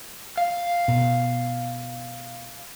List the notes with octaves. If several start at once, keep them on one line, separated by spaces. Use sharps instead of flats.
F5
B2